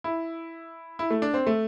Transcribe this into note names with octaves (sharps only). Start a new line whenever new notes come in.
E4
E4
A3
D4
C4
A3